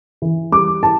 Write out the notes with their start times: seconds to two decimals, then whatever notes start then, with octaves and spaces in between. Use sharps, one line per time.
0.22 E3
0.52 G3 D6
0.83 E4 A5